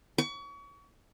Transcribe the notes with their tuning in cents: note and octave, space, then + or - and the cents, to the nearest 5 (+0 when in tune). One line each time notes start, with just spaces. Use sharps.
C#6 +35